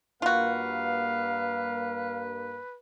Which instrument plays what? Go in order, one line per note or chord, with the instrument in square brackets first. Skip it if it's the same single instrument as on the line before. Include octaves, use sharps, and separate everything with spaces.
[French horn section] G2 A#3 [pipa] F4 F#4 [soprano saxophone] B4 [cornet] F5